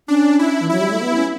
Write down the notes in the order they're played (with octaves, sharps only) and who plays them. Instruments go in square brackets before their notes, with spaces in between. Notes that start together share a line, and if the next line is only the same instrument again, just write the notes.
[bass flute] C#4 [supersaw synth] D4
[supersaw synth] E4
[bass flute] E3
[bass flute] F#3 [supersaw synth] E4
[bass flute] G3
A3
B3
C#4